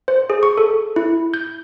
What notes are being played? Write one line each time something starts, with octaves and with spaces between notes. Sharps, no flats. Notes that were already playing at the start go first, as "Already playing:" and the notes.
C5
G#4
C#6
A4
E4
G6